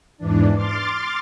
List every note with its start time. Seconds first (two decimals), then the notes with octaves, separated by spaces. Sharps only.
0.18 E2 G#2 E3 D4
0.55 C6 D6 F6 A6